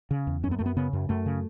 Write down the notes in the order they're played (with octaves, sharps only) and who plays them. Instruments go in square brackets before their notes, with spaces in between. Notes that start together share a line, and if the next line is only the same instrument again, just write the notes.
[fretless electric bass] C#3
E2
F#2 C#4
B3
F#2 A3
B3
C#3 B3
F#2
F#2 A3
C#3